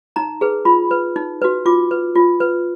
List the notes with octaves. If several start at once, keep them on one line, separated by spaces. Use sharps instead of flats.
D#4 A#5
G#4 B4
F4 B5
B4
D#4
F#4 B4
F4 D6
B4
F4
B4